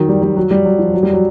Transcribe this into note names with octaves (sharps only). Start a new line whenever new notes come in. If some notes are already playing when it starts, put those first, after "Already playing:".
Already playing: D#3 F#3
G3
G3
F#3
G3
F#3
F3
F#3
G3
F#3